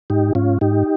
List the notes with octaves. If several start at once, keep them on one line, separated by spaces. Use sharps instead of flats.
G#2 D#4 G4
G#2 C#4 F4
G#2 D#4 G4